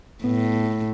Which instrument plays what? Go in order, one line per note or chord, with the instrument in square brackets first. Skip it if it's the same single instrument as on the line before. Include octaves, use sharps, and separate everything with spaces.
[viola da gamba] A2 [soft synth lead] B3